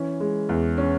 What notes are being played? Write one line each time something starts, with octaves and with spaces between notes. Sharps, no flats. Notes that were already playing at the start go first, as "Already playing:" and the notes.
Already playing: E3 C#4
G#3
E2
C#4